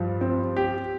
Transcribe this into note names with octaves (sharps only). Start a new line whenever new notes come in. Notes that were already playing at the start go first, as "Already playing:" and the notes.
Already playing: G2 F3
C4
G4